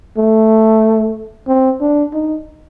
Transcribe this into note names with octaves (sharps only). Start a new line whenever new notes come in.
A3
C4
D4
D#4